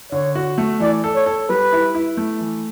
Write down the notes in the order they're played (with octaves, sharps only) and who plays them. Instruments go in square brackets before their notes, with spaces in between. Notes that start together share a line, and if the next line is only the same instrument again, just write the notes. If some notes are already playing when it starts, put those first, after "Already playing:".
[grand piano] D3 [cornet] C#5
[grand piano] F#4
A3
[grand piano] E3 [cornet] D5
[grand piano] A4
[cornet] C#5
[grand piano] A4
[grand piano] G3 [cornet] B4
[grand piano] E4
E4
A3
E3